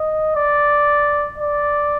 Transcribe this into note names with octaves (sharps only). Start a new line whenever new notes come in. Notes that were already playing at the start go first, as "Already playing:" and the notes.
Already playing: D#5
D5
D5